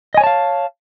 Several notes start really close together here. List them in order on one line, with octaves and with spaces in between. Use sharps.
D#5 G#5 C#5 A5 F5